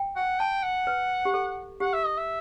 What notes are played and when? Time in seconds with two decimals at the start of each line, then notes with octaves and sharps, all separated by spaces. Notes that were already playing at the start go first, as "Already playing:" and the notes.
Already playing: G5
0.16 F#5
0.39 G5 A5
0.63 F#5
0.87 B4
1.25 G4
1.34 A4
1.80 G4 F#5
1.93 E5
2.05 D#5
2.17 E5